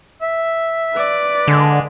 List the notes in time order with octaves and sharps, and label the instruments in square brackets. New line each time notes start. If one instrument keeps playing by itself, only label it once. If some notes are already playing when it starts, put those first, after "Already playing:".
[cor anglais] E5
[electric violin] B4 D5
[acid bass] D3 [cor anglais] G#3